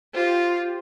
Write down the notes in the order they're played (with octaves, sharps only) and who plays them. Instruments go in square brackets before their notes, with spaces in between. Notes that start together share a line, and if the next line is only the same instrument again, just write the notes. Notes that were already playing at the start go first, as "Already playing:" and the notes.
[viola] F4 [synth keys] G4 C5